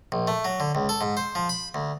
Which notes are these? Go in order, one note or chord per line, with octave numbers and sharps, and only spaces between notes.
A#1
A3
F#3
D3
C#2
A4
G#2
C5
F3
B5
D2